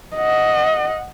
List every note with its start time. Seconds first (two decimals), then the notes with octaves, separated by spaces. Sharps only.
0.16 D#5 F#5